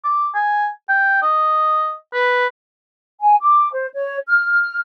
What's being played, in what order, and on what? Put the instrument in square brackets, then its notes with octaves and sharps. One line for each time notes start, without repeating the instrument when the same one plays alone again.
[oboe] D6
G#5
G5
D#5
B4
[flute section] G#5
D6
C5
C#5
F6